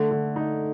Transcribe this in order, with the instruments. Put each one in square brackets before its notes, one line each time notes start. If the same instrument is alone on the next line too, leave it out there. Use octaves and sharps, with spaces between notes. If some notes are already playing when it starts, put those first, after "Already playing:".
Already playing: [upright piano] D3 [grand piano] A3
[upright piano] D3
D#4